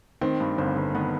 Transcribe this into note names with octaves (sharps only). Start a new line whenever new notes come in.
D#3 C4
G2
G1 C4
G1
D#3 B3